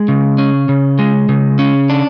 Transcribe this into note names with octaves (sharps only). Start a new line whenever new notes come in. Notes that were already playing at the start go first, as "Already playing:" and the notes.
Already playing: G#3
C#3
C#4
C#3
G#3
C#3
C#4
D4